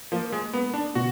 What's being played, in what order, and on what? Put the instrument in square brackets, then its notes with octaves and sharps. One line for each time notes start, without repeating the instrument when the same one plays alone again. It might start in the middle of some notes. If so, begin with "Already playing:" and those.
[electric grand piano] F3 [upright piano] A#3
[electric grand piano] G#3
[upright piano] A#3 [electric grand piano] B3
[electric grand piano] D4
[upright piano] B2 [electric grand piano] F#4